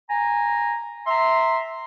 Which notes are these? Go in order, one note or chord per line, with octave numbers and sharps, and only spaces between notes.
G#5 A#5
E5 A#5 C6